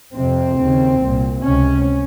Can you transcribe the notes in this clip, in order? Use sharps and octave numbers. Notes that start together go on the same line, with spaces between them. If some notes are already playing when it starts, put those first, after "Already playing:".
F2 C3 C4
D#2 C#3
C2 A#2
C#2 C3 C#4